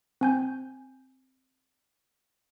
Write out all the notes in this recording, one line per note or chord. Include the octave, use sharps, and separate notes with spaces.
C4 G#5 G6